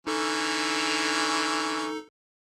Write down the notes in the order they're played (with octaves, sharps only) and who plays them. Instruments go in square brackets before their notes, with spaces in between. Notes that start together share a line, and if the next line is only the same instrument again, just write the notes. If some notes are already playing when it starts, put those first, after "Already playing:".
[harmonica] D3 E3 C#4 [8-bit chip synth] D#4 A4